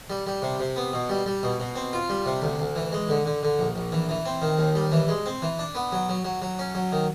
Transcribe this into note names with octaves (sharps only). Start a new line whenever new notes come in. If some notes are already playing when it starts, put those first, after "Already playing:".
G3
G3
C3
C3
B3
B2
G3
G3
B2
B2
C4
F4
G3
C3
D2
D2
E3
G#3
D3
D3
D3
A#1
A#1
E3
E3
C4
D#3
D#2
G3
E3
G#3
C4
E3
D4
B3
F#3
F#3
F#3
F#3
C#4
F#3
D#3